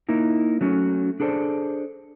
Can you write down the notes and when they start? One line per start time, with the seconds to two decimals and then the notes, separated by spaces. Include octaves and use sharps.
0.09 A#3 D#4 E4
0.61 F#3 A3 C#4
1.20 D4 G#4 A4 C5 D5